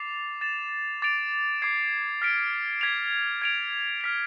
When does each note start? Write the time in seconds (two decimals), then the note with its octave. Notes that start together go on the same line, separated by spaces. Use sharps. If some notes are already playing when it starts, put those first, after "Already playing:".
Already playing: D6 A6 C7 F7
0.41 A6 E7
1.02 D6 A6 D7 F7
1.62 D6 G#6 C7
2.22 F6 B6 D7
2.81 G#6 B6 D7 F7
3.42 G#6 D7 F7
4.01 F6 B6 F7